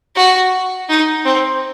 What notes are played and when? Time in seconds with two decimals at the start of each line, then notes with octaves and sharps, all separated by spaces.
0.15 F#4
0.89 D#4
1.25 C4